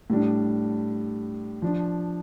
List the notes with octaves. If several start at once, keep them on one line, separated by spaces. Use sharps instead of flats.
A2 G3 D4
F3 D4